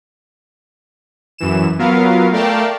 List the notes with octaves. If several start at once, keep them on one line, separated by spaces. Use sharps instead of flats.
F#2 E3 E7
F#3 B3 F4 A#4 F5
A3 A#4 D5 F5 G5 A5